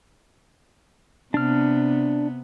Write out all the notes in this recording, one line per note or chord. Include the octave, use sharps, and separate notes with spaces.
C3 B3 D4 F6